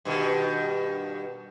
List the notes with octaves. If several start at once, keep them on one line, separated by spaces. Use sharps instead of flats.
G2 B2 D#3